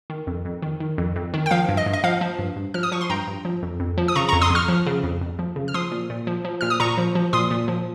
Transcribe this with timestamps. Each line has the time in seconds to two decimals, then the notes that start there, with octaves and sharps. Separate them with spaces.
0.10 D#3
0.27 F2
0.45 F2
0.62 D#3
0.80 D#3
0.98 F2
1.16 F2
1.34 D#3
1.46 G5
1.51 F3 F5
1.69 G2
1.77 D#5
1.86 G2
1.93 D#5
2.04 F3 F5
2.21 F3
2.39 G2
2.56 G2
2.74 F3 F6
2.83 D#6
2.92 F3 C#6
3.01 C6
3.10 G2 G5 A#5
3.27 G2
3.45 F3
3.63 F2
3.80 F2
3.98 F3
4.08 D#6
4.15 C#3 A#5 C#6
4.29 A#5 C#6
4.33 F2
4.42 C6 D#6
4.50 F2 C#6 F6
4.68 F3
4.87 C#3
5.03 F2
5.21 F2
5.39 F3
5.56 C#3
5.68 F6
5.74 F3 C6 D#6
5.92 A#2
6.10 A#2
6.27 F3
6.45 F3
6.61 A#2 F6
6.70 D#6
6.80 A#2 A#5 C#6
6.98 F3
7.15 F3
7.33 A#2 C6 D#6
7.51 A#2
7.68 F3